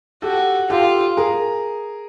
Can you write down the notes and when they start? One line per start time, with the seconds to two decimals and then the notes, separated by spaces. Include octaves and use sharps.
0.22 F#4 G4 A4
0.69 F4 G4 A4
1.17 G#4 A#4